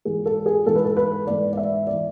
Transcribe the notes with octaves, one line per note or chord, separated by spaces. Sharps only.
G#2 E3 G#4
A4
G#4
G#2 E3 A4
B4
A4
B4
G#2 E3 D5
D5
E5
E3 D5